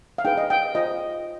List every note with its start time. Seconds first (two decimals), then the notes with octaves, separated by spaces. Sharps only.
0.18 F5
0.25 D#4 G#4 B4 G5
0.37 D#5
0.50 G5
0.75 F4 C5 D#5